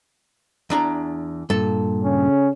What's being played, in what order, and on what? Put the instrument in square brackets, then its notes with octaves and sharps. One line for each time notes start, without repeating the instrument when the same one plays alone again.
[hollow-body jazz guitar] E2 D4 A#5
[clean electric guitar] G2 A#2 [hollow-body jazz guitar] A4
[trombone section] C#3 C#4